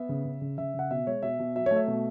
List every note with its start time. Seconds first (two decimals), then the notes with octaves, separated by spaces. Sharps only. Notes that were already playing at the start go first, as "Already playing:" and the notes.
Already playing: B3 E5
0.09 C#3
0.25 C#3
0.41 C#3
0.58 C#3 E5
0.74 C#3 F#5
0.91 B2 E5
1.07 G#3 C#5
1.23 B2 E5
1.39 B2
1.55 F#3 E5
1.66 A3 C#5
1.76 E5
1.87 B2